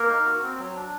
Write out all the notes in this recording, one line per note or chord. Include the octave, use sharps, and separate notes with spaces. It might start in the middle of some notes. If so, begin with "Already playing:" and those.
Already playing: A#3 A#4
D#4
F#4
C4
F#3
D4